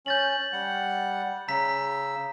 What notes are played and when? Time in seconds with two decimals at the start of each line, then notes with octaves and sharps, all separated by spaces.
0.06 C#4 G6 A6 F#7
0.53 G3 F#5
1.48 C#3 A#5 E6 B6